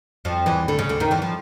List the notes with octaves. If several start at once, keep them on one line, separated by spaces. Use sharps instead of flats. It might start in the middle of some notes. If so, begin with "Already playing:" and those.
F2 F3
E2 E3
D2 D3
C#3
D2 D3
D#2 D#3
E2 E3
F3